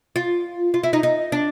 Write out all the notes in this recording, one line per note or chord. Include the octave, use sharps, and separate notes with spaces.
F4
F4
E4
D#4
D#4
D4